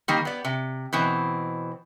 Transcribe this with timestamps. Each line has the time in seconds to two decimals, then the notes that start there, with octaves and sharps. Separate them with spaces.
0.08 D#3 G3 A#3
0.25 B3 D5
0.45 C3
0.93 B2 E3 C4